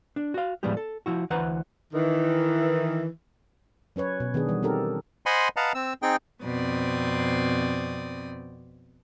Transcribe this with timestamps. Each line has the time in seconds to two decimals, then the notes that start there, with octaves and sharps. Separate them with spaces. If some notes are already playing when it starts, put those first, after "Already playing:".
0.16 D4
0.34 F#4 F5
0.63 A2 F3 G3 G#3 B3 G4
0.77 A4
1.06 F3 E4 F#4
1.30 D2 E3 B4 C5 F#5 A#5
1.94 D#3 E3
3.96 F#3 C#4 B4 C#5
4.20 B2
4.34 D#3 B3 D4 G#4
4.49 E3 G3
4.63 C4 D#4 G4 A4 A#4
5.26 C5 D#5 F#5 G#5 B5 C6
5.56 B4 D#5 F5 F#5 A5 A#5
5.75 C4 E6
6.02 C4 D#4 G#4 G5
6.43 F2 B2 C4 D5 D#6